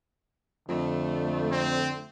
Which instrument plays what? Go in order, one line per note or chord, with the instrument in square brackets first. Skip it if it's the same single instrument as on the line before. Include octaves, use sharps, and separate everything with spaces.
[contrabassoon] F2 [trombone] D3 [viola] A3
[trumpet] C4